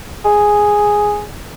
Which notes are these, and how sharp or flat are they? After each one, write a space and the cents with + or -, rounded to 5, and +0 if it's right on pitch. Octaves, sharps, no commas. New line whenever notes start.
G#4 +0